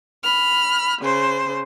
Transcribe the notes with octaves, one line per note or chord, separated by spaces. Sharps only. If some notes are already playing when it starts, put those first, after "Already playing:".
B5 F6
C#3 C5